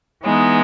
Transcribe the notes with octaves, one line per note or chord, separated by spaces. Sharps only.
E3 G#3 B3 D#4